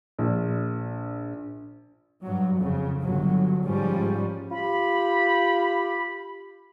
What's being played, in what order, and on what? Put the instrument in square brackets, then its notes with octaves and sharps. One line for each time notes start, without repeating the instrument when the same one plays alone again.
[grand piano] A#1
[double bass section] G2 F#3
F2 C#3
G1 F#3
G#2 F3 G3 C#4
[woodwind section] F4 G4 B5